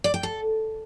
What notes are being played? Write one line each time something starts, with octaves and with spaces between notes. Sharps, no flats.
D5
G5
A4